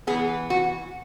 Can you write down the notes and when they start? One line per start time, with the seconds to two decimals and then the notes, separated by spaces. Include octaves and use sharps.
0.07 E3 B3 G#4
0.50 F#4